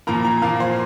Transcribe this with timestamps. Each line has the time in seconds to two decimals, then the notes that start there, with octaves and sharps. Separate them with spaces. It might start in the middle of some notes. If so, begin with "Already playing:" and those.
0.07 A#2 F3 A#3 A#5
0.25 A#5
0.42 A#2 F3 A#3 F5
0.60 C5